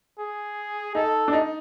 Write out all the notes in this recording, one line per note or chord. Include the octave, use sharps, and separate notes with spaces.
G#4
D#4 A4
D4
D#4